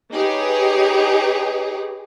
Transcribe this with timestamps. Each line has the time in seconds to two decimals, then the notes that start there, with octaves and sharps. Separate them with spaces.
0.13 D#4 G4 G#4 B4 C#5